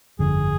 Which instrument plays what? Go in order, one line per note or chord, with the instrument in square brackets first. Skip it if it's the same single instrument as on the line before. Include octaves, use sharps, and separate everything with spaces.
[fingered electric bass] G1 F2 D3 [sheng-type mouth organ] G#4